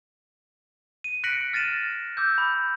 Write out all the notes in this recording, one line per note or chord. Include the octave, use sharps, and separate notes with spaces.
D#7
F#6 A#6 B6 C#7 D7 F#7
F6 A6 A#6 D#7 E7
D6 E6 G6
B5